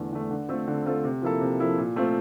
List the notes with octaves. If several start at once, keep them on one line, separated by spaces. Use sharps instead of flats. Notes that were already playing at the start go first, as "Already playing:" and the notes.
Already playing: E2 D3 A3
D3 A3
D3
A3 C4 F4 A4
D3
A3 C4 F4 A4
C3
F3 A#3 E4 A4
C3
F3 A#3 E4 A4
A#2
A3 C4 F4